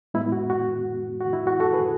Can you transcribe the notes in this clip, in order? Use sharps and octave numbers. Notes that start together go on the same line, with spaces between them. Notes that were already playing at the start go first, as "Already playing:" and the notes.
A2 G#3 B3 E4
F#4
F#4
F#4
E4
F#4
F#4 A4
G#4 B4